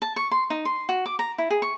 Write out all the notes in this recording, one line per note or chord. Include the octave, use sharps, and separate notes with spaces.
A5
C#6
C6
D#4
C6
F#4
D6
A#5
E4
G#4
C#6